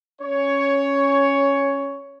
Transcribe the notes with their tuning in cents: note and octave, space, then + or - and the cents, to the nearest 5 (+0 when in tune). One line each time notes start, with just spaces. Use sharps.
C#4 -5 C#5 +10